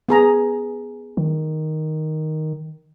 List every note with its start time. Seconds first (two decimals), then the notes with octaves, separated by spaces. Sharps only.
0.09 B3 G#4 A#5
1.17 D#3